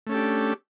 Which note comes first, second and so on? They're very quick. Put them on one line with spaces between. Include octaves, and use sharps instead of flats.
A3 C#4 A4 G4 D4